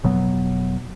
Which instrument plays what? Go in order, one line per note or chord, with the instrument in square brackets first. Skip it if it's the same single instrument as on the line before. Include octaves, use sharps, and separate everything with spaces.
[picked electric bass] F1 B2 F#3 B3